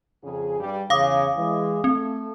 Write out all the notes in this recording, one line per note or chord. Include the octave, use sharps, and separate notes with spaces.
F2 C#3 G#4
G2 G3
E2 C#3 F5 D6 D#6
E3 G#3
A3 C4